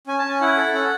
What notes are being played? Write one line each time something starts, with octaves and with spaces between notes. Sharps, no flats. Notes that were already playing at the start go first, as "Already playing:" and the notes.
C#4 G#5
A5
C#4
G#5
E4 F#5
A4
C#4 F#5